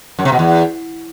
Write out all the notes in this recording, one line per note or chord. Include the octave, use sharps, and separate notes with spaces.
F#2
C3
B2
E2